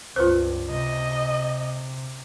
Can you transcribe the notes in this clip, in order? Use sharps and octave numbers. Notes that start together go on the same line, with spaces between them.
C#2 G2 F4 B4 C5
C3 D#5